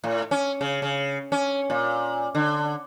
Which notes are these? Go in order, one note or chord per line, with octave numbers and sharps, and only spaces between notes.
A2
C#4
C#3
C#3
C#4
A#2
D3